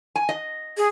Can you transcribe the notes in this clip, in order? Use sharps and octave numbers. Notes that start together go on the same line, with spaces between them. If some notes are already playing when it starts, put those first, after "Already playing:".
G#5
D#5
G#4